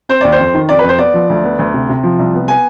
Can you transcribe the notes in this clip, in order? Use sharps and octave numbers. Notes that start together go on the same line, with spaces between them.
C4 C5
D#2 D5
C5
F2
D#3
F2 D5
B4
F2
C5
B3 D5
F3
D2
B3
D2
C3
C3
F3
C2
B3
B3 G#5